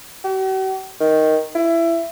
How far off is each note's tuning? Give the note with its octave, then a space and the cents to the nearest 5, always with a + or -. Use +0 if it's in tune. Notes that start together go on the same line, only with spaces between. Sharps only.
F#4 +45
D#3 +5
E4 +20